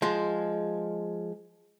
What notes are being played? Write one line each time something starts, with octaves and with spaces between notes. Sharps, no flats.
F3 G#3